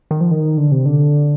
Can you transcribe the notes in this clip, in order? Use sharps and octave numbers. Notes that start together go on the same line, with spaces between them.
D#3
F3
D#3
D3
C3
D3